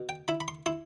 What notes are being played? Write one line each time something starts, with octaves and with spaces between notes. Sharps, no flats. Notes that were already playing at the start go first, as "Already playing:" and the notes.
Already playing: B2
G5
E4 B5
B5
C6
E4 C6